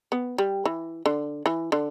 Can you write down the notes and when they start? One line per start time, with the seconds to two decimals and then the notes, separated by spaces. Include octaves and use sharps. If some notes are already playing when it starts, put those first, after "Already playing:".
0.12 B3
0.38 G3
0.65 E3
1.06 D3
1.46 E3
1.72 D3